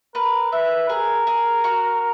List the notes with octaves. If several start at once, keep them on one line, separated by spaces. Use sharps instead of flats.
A#4 B4
B4 E5
G#4 A#4
G#4
F#4